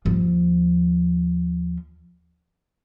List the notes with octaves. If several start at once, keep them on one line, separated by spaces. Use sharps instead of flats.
D#2 F3